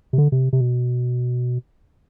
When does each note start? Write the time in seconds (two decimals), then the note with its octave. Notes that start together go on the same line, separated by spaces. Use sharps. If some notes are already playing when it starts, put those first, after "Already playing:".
0.13 C3
0.18 D3
0.32 C3
0.53 C3
0.61 B2